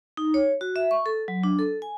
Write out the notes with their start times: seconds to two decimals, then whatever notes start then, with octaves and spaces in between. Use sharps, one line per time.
0.17 D#4
0.34 C#5
0.61 F#4
0.76 E5
0.91 C#6
1.06 A4
1.28 F#3
1.43 D4
1.59 A4
1.82 G#5